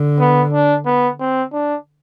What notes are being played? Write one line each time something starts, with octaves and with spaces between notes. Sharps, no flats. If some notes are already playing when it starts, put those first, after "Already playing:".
Already playing: D3
B3
D4
B3
C4
D4